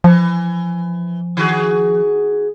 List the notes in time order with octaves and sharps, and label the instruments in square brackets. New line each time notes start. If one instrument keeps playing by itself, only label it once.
[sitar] E3 [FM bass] F3
[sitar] D#3 F#4 G#4